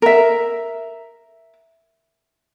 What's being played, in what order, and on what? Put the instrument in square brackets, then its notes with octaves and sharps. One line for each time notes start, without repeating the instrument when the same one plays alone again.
[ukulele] A#4 E5